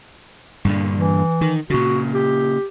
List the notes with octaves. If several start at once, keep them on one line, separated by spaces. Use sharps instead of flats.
G2 A#2 D3
E3
D#3
A#2 C#3 F#4
G4